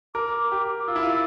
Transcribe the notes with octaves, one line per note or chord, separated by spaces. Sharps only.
A#4 D6
G4
D6
F4 E6
E4
F4